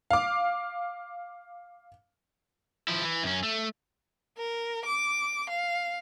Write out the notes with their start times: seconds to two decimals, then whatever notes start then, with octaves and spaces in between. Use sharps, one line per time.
0.11 F5 D6
2.88 F3 E4
3.05 E3
3.23 F#2 C#4
3.43 A3
4.38 A#4
4.85 D6
5.49 F5